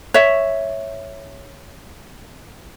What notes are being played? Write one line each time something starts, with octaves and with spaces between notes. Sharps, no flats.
C#5 E5